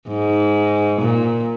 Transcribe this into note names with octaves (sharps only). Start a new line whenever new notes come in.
G#2
A#2